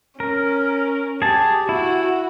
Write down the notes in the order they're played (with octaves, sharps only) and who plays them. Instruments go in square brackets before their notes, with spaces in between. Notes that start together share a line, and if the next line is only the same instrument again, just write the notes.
[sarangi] C#4 [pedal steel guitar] A#4
[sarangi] G4 [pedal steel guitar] G#4 A5
[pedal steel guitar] E4 [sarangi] F#4